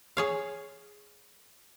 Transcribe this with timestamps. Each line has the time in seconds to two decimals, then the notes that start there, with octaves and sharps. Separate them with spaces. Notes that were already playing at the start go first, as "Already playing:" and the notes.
0.17 G#4 C#5 F5